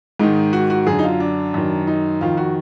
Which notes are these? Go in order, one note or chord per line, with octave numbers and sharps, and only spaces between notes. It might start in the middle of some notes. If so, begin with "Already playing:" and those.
G#2 D#3 D#4
F#4
F#4
F#2 D3 G#4
D#4
F4
D4
F#2 D#3
D#4
F2 D#3 F4
F#4